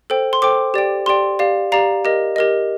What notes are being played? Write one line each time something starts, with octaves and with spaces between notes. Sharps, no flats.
A4 C5 G5
C6
A4 C5 G5 D6
G4 D5 G5
G4 D5 G5 C6
G4 D5 F5
G4 D5 F5 A#5
G4 A#4 D#5
G4 A#4 D#5